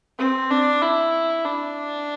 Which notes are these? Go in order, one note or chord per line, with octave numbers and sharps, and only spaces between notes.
C4
D4
E4
D4